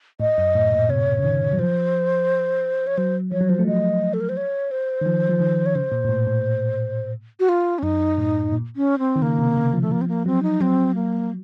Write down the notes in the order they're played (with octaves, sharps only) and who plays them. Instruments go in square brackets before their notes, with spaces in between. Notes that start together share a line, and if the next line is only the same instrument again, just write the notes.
[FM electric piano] A2 [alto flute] D#5
[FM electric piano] F#2
A2
A#2
[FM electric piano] C3 [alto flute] C#5
[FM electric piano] C#3
D#3
F#3
[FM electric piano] F3 [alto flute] C5
[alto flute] C#5
[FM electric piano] F#3 [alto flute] C5
[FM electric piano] F3 [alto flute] C#5
[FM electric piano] F#3
[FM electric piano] F3 [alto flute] C5
[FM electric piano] A3
[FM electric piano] F#3 [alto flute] D#5
[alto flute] A4
A#4
C5
C#5
C5
[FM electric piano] D#3
F3
F3
D#3
[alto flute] C#5
[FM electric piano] C#3 [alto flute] C5
[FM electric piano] A#2
A#2
A2
A2
[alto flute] F#4
F4
C#4
[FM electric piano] F#2 [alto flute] D#4
[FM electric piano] A2
A#2
[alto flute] C#4
C4
[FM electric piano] D#3
[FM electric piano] C#3 [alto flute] A#3
[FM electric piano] C3
C#3
F3
[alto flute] A3
[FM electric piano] F3 [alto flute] A#3
[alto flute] C4
A#3
[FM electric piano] F#3 [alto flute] C4
[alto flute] D#4
[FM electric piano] F#3 [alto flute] C4
[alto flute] A#3